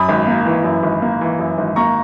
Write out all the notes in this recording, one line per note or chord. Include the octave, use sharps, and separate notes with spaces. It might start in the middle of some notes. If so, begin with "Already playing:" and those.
Already playing: F#2 B5 D#6
G#1
A#3
E3
F#2
G#1
A#3
E3
F#2
G#1
A#3 A#5 C#6